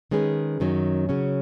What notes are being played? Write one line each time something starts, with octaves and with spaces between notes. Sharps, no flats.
D#3 G#3 C#4 G#4 B4
F#2 D#3 F#3 C#4
C#3 F#3 C#4